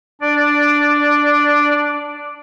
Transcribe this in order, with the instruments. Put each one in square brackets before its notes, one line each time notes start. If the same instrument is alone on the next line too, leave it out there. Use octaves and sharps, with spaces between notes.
[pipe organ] D4 D5